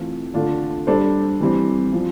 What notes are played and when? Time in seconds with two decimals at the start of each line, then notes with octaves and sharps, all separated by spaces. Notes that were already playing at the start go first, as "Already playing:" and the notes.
Already playing: E3 A3 C4 F4 A4
0.34 D3 A3 D4 F4
0.87 G3 D4 A4 C5
1.40 E3 G3 C4
1.92 F3 C4